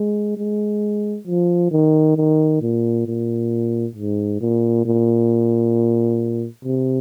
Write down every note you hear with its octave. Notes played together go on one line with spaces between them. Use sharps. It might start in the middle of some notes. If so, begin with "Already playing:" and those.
Already playing: G#3
G#3
F3
D#3
D#3
A#2
A#2
G#2
A#2
A#2
C3